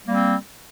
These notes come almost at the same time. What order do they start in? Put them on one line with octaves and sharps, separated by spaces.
G3 A#3 C4